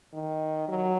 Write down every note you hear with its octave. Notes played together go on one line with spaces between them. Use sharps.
D#3
F#3